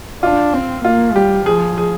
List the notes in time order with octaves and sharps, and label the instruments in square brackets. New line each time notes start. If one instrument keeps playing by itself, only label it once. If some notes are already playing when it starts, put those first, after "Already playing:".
[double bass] D4 [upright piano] F4
[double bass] C4
[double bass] A#3 [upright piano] F4
[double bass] G3 [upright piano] G4
[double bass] F3 [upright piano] G#4
[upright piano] G#4